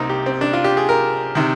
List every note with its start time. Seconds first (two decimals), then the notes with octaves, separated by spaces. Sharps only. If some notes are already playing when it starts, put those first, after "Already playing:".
Already playing: C2 C3 A#3 C4 D#4
0.09 G4
0.26 C4
0.41 D4
0.53 F4
0.64 G4
0.77 G#4
0.89 A#4
1.35 C3 D#3